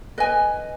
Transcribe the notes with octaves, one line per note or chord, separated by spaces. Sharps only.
B4 D#5 G#5